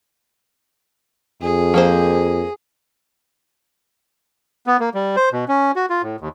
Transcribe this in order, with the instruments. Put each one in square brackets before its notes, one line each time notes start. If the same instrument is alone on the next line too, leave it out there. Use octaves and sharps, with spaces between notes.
[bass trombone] F2 [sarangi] G#4
[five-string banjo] F3 A#3 C5
[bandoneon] B3
A#3
G3
C5
B2
C#4
F#4
F4
A2
D#2